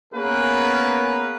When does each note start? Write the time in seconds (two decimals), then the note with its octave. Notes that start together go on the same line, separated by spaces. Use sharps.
0.13 A#3 B3 C#4 G#4 A#4 B4